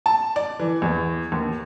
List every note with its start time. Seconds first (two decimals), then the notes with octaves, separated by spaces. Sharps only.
0.06 A5
0.36 D5
0.59 E3
0.82 E2
1.32 D#2